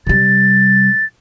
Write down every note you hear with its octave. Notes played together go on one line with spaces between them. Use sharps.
C3 G3 A6